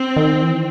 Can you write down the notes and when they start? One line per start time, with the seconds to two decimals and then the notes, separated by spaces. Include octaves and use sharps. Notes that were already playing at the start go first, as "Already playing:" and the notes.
Already playing: C4
0.16 D#3
0.42 E3